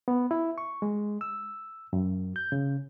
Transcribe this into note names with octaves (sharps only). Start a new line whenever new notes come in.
B3
E4
C#6
G#3
E6
F#2
G6
C#3